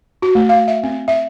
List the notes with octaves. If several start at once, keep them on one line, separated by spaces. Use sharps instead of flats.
F#4
A3
F5
E5
C4
E5